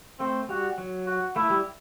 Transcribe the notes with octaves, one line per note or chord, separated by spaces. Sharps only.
A3 C4
G3 F#4
F#3
F#4
A3 E4
G3